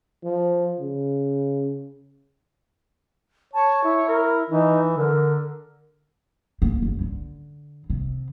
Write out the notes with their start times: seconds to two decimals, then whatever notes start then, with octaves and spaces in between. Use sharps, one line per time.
0.24 F3
0.80 C#3
3.54 C#5 A5
3.84 E4
4.09 A#4
4.50 E3 D#4
4.97 D3 A#4
6.62 A#3
6.82 F#1
7.01 D3
7.90 C3